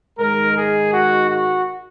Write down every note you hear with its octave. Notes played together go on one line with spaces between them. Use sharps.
G#2 D#3 G#3 A#4
G#4
F#4
F#4